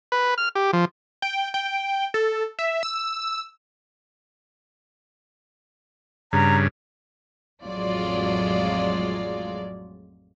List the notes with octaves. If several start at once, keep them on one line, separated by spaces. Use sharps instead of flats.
B4
F6
G4
F3
G5
G5
A4
E5
E6
G2 C#3 A#5
A1 F2 F#3 G#3 F4 D5